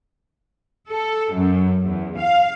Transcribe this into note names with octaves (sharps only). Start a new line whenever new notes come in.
A4
F#2
E2
F5